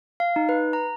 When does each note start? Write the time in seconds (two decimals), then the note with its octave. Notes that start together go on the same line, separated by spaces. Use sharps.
0.20 F5
0.36 D#4
0.49 B4
0.73 A#5